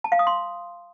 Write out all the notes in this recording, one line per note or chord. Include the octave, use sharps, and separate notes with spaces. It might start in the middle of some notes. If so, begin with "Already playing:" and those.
A5
F5
D#6
C6